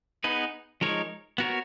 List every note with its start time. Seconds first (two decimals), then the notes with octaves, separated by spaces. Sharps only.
0.24 B3 D#4 G#4 B4
0.81 F3 G#3 D#4 A#4 C#5
1.38 B3 F#4 A#4 C#5